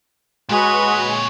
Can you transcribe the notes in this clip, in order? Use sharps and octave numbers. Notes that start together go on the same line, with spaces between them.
A#2 G#3 F#4 B4 C#5